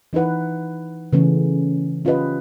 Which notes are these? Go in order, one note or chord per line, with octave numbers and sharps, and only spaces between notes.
E3 D#4 E4 B4 F#5
C#3 E3 A3 C#4
C#4 F4 G4 B4 D#5